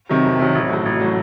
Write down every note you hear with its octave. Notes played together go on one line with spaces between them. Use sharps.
C3 D#3 F#3
F2
C3 D#3 F#3
A1
A2 F#3
A1
A2 F#3